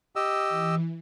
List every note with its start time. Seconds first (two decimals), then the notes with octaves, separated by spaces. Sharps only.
0.16 G4 D#5 E6
0.49 E3